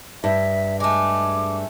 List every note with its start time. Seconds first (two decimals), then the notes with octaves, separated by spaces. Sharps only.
0.24 G2 E5
0.80 G#3 A3 D6